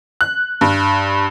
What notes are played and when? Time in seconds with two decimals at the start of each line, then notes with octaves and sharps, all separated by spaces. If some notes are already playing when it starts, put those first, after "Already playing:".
0.21 F#6
0.61 G2